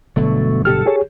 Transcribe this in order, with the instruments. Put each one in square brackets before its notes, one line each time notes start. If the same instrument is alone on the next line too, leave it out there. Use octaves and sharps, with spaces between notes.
[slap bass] G1 D3 F#3 [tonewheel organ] B2 A3
[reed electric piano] B2 G4 F6 [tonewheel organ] A4
[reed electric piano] G4 G#4 C#5